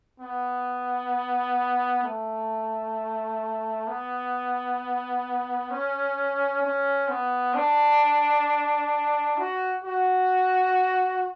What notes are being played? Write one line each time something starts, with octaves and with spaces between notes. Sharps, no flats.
B3
A3
B3
C#4
C#4
B3
D4
F#4
F#4